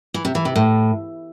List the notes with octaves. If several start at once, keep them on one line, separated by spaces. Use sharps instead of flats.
E3
C3
E3
C3
A2